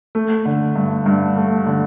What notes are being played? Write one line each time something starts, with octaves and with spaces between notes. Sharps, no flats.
A3
D3
G2
G2
A3
D3